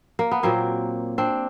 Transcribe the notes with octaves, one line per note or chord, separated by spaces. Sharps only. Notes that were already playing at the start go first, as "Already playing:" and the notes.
A#3
B3
A#2 F#3 A#3 C4
C4 D4